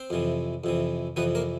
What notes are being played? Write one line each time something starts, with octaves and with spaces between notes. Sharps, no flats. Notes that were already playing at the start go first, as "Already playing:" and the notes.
Already playing: C4 C5
F2 C3 E3
F2 C3 E3
F2 C3 E3 B3 B4
A#3 A#4